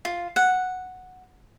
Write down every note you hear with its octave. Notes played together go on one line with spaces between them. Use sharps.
F4
F#5